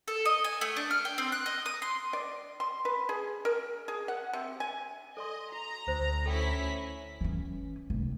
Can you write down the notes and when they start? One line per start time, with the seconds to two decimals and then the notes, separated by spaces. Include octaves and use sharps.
0.08 A4
0.25 D#5
0.44 G#5
0.61 A3
0.77 D4
0.91 F6
1.05 G5
1.18 C4
1.32 F#6
1.46 D#5
1.66 D#6
1.82 C6
2.13 D5
2.60 C6
2.85 B4
3.09 G#4
3.45 A#4
3.88 G#4
4.08 F#5
4.33 C3
4.60 G#5
5.17 A4 D5 D#5 C6
5.52 F#4 A#5
5.88 D2 C5
6.26 C#4 E4 A4 G5 B6
7.21 E3 C#4
7.90 F1